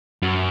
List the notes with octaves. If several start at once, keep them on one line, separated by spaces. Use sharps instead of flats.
F#2